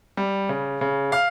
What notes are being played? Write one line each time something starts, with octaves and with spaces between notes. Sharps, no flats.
G3
C#3
C#3
F5 F6